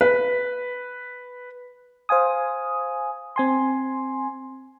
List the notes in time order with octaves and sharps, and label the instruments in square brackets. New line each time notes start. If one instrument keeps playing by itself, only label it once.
[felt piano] B4
[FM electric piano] C5 F5 G#5 D#6
C4 G#5 C6